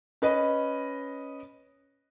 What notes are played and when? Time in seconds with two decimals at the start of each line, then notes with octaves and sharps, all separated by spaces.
0.22 C#4 B4 D#5